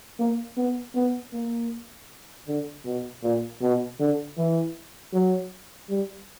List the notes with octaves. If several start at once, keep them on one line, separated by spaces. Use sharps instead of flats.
A#3
B3
B3
A#3
D3
B2
A#2
B2
D3
E3
F#3
G3